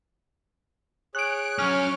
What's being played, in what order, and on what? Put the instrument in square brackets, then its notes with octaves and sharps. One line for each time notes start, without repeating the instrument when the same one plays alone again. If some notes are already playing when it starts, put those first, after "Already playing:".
[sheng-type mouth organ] G#4 C#5 [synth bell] F#6 D7
[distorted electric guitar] F#3 C#4 [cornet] C#5 [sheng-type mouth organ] D6 [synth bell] F6